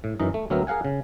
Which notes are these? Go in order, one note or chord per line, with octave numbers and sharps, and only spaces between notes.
A2
F#2 E3 D#4 D#5
A3
D2 F#3 B3 C4 A#4 E5
G#4 A#4 F5 F#5 G#5
C#3